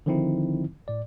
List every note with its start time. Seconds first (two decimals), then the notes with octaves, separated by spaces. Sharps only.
0.06 D3 D#3 F3 C4 D#4 E4
0.88 A2 D5